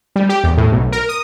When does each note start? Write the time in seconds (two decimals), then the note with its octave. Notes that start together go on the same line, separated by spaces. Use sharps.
0.16 G3
0.29 G4
0.44 E2
0.57 A2
0.72 B1
0.92 A#4
1.09 D#6